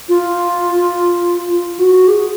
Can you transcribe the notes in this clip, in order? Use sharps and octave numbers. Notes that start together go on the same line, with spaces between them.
F4
F4
F#4
G#4